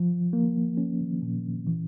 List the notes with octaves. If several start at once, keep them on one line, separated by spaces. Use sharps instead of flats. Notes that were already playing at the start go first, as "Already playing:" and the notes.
Already playing: F3
A#3
C#4
A#2
E3